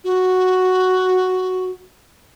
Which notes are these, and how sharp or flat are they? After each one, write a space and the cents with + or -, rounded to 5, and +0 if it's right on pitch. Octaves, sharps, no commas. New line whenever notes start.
F#4 +0